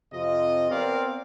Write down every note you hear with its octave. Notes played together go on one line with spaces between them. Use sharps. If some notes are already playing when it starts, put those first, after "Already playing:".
F2 C3 F4 D#5
B3 C4 A#4 D5 F5